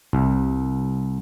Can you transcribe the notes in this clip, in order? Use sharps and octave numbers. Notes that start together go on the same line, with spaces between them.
C2